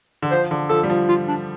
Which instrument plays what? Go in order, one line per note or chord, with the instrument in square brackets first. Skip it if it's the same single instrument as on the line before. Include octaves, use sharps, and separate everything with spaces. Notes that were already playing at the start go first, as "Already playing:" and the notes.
[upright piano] D3
[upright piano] F3 [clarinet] C5
[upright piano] D3
[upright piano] F3 [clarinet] A4
[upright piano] G3
F3
[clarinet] F4
D4